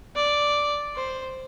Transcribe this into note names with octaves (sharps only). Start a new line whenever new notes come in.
D5
C5